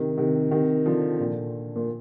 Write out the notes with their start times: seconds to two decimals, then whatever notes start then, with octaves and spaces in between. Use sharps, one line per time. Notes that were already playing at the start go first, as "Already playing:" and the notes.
Already playing: C3 D#3
0.18 C3 D#3
0.51 C3 D#3
0.85 D3 F3
1.19 A#2 D3
1.76 A#2